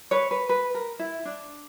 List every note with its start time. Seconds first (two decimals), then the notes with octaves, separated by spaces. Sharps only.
0.11 B4 C#5
0.31 B4
0.49 B4
0.74 A#4
0.99 E4
1.25 D4